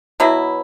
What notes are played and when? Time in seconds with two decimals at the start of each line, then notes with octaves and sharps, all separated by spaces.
0.20 B2 F#3 B3 E4